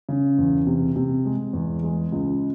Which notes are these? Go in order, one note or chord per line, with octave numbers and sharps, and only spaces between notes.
C#3
E2
C3
C3
G#3
E2
G#3
C#2